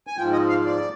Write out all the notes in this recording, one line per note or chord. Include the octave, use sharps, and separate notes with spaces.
G#5
G#2 F3 G5
D#5
F5
D5